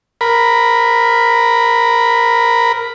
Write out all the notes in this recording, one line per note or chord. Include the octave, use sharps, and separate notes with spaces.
A#4 B5